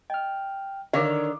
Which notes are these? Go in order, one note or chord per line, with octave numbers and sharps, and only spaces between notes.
D#5 G5 F6
D3 D#3 A#4 C#5 F5 D6